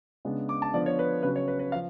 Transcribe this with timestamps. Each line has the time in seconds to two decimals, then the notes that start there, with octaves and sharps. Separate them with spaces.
0.25 C#3 G#3 B3 D4
0.49 D6
0.62 A5
0.74 D3 F3 B3 D4 D5
0.86 C#5
0.99 B4
1.23 C#3 F#3 C#4 B4
1.36 C#5
1.48 B4
1.59 B4
1.72 F3 F5